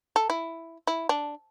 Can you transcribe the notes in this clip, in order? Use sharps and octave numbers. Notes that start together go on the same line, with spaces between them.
A4
E4
E4
D4